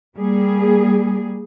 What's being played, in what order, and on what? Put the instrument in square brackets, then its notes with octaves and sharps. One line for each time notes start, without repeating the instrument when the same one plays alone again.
[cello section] G3 A#3 G#4